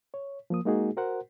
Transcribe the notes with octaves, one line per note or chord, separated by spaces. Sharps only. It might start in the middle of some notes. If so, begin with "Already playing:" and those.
C#5
F3 A#3 D#6
G#3 A#3 D#4 F#4 G#4
F#4 A#4 C5 F#5